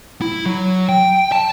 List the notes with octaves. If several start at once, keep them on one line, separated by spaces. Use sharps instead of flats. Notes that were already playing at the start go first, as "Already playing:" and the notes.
E4
F#3
G5
A5